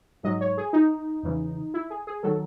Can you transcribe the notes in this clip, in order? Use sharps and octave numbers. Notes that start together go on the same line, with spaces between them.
G#2 F#3 D#5
C#5
G#4
D#4
E2 C#3 E3
E4
G#4
G#4
D#3 F#3 A4